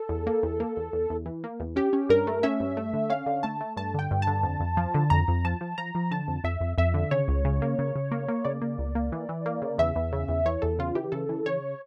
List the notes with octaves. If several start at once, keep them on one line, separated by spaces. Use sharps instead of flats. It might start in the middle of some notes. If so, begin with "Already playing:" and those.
Already playing: A4
E2
A#3
E2
A#3
E2
E2
E2
E3
A#3
E2
C#4 G4
C#4
G2 A#4
A3
C#4 E5
G2
A3
D3
C#4 F5
D3
A3 A5
A3
G2 A5
D3 G5
G2
A5
D3
F2
F2
F3
D3
F2 A#5
F2
F3 A5
F3
F3 A#5
F3
D3 A5
F2
F2 E5
F2
F2 E5
D3
C#3 C#5
C#2
C#3
A#3
C#3
C#3
A#3
A#3
C#3 D5
A#3
C#2
A#3
E3
E3
A#3
C#3
E2 E5
E2
C#3
E2
E3 C#5
E2 A4
C#3 F4
E3 G4
C#3 A4
E3
C#3 C#5